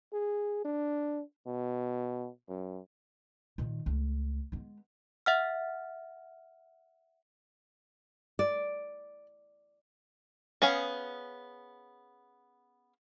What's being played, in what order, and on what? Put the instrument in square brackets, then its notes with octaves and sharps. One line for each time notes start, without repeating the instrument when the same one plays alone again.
[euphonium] G#4
D4
B2
F#2
[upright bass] A#2 D#3
C#2 A3
G#3 B3
[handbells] E5 F#5 F6
[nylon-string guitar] D5
[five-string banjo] B3 C#4 G#4 F5